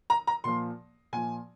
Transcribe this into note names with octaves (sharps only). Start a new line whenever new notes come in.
A#5
A#5
A#2 F3 C6
A#2 F3 G#5